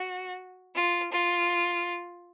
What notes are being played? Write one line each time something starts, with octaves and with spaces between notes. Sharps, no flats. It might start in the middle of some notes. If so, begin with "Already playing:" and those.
Already playing: F#4
F4
F4